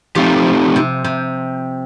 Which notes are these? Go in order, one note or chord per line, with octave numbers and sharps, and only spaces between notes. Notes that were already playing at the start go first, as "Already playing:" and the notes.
F3 A3 C4 D#4 G4
C3
C3